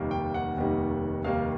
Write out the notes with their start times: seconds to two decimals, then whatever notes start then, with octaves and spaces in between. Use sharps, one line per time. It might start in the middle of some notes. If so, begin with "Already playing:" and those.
Already playing: F1 D#2 D#3 G3 A#3
0.11 G5
0.34 F#5
0.57 F1 D#2 D#3 G3 A#3
1.24 F1 D#2 D#3 G3 A#3 F5